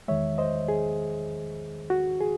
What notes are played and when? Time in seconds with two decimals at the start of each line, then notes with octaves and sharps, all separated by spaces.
0.08 E2 D#3 G#3 C#5 E5
0.38 C5 D#5
0.68 G#4
1.90 F#4
2.21 G#4